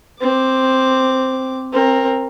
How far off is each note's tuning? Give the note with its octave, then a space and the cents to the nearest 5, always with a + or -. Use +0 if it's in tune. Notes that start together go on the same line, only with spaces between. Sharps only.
C4 +0 D6 +0
C4 +25 A#4 +0